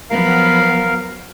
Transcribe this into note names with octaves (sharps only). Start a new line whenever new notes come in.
F3 F#3 B3 A#4 F5